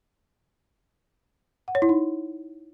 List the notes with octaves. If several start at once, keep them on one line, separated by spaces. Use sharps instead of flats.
F#5
C#5
E4
D#4